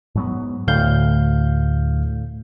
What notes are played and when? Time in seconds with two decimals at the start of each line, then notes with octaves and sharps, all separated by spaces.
0.15 G#2 F#3 B3
0.68 D2 A2 F5 G6